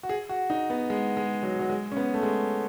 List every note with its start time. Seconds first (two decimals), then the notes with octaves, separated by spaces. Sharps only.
0.03 F#4
0.09 G#4
0.29 F#4
0.50 D#4
0.70 B3
0.90 G#3
1.17 G#3
1.43 F#3
1.59 F#3
1.69 G#3
1.92 C#4
1.97 B3
2.14 A3
2.23 G#3